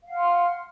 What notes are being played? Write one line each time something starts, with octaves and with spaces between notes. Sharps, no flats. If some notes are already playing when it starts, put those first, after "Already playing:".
F5 F#5 C6 F6